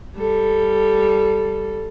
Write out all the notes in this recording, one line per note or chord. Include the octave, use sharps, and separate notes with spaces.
G3 A4